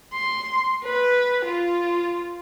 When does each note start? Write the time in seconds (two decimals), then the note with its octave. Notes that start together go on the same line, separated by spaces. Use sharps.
0.13 C6
0.84 B4
1.46 F4